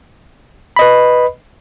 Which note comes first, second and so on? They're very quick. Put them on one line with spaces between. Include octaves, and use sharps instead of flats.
B5 D#5 B4